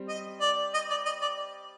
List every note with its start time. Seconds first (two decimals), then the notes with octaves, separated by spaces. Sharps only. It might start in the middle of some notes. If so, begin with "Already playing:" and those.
Already playing: G3 C4
0.08 D#5
0.41 D5
0.74 D#5
0.90 D5
1.05 D#5
1.22 D5